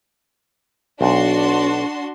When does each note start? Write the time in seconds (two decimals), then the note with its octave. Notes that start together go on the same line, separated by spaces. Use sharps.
1.01 B1 D4 F#4 C6